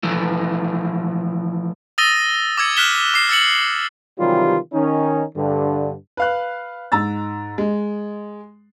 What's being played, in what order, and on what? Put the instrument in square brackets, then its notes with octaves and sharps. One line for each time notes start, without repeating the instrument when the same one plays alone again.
[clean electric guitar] E3 F3 A3 E4
[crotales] D#6 E6 A6 A#6 D#7 G7
D6 E6 G#6 C#7
F6 F#6 B6 E7 G7
D6 C7
E6 A6 C#7 F#7
[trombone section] C3 D#3 E3 F#3 G3 F4
D#3 C#4 D#4
G2 D3
[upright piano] B4 F5 F#6
G#2 A#5 E6 A6
G#3